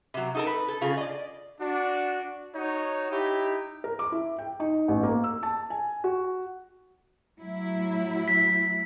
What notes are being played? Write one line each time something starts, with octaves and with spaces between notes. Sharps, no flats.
C3 F#3
D#4 A4 A#4
B4
A4
C#3 F4 G#4
D5 D#5
D4 F#4
D#4 F#4 C#5
D#4 E4 G4
A#4
D6
E4
G5
D#4
A1
A#3
E6
A5
G#5
F#4
A2 F#3 E4
B6